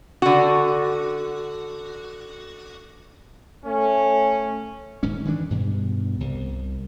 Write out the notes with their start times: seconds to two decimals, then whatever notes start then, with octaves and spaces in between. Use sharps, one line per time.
0.22 D3 F#4
3.65 A3 C#4
5.03 D#1 G#2 C#4
5.25 D#3 E3 A3 D4
5.50 G2 B2
6.20 C2